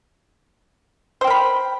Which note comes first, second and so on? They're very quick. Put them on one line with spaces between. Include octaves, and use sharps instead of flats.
C5 G5 A#4 B5